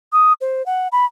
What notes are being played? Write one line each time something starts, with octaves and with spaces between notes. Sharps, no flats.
D#6
C5
F#5
B5